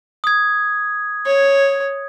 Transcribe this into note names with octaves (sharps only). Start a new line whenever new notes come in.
D#6 G#6
C#5